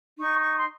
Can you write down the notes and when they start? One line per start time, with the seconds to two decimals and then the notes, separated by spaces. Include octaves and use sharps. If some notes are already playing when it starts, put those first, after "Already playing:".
0.18 D#4 C#6
0.41 C#6
0.58 C6